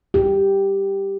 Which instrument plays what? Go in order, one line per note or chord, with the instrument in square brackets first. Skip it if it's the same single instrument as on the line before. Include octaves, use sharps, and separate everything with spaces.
[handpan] G4